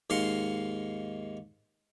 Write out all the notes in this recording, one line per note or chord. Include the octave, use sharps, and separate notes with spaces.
D#2 G#2 F5 C6 C#6